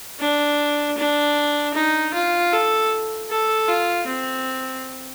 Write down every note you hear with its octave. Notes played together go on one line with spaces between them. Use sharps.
D4
D4
D#4
F4
A4
A4
F4
C4